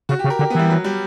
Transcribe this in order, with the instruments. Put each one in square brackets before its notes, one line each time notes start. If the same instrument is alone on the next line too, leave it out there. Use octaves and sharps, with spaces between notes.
[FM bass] C#3 [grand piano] F#4
[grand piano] G4
[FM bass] C#3
[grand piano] A#4
[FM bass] D3 [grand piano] G4
[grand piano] B3
[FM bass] E3 [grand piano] G3
[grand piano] F#3
G3